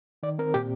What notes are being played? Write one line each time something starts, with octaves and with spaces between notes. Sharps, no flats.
D#3 D5
C4 A#4
A#2 G4